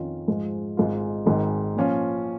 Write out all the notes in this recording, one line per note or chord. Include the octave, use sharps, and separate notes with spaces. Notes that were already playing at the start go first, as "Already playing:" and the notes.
Already playing: F2 D#3 C#4 F4
G#2 F3 G#3 F4
G#1 G#2 G#3 F4
G#1 G#2 D#3 G#3
A#2 F3 C#4 F4